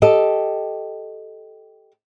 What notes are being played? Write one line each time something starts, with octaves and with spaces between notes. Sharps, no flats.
G4 A4 D#5